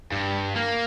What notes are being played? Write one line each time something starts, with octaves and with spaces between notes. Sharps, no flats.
G2
A#3